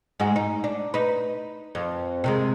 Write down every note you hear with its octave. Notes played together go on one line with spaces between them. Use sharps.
G#2 G#3 F#4
D#4
D4
D#4 B4
F2
C3 D#3 G#3